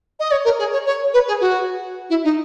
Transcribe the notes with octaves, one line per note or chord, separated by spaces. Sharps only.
D#5
C#5
A#4
G#4
C#5
C#5
B4
G#4
F#4
E4
D#4